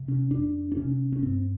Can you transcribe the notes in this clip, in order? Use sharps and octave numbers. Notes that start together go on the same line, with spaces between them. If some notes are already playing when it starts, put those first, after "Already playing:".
Already playing: C3
C#4
F2 D4
D4
C3 C#4
C#4
G2 C4